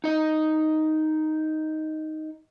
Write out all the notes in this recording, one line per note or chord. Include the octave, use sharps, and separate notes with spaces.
D#4 D#5